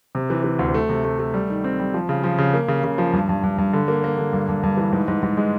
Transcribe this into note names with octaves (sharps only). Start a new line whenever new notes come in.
C3
E3
E3
D2
A3
C3
A3
A3
G3
D#3
C4
G3
F3
C#3
F3
C#3
A#3
C#3
C#3
F3
G2
G2
G2
G2
D3
A#3
A#3
D3
G2
G2
G2
E3
G#2
G#2
G#2
G#3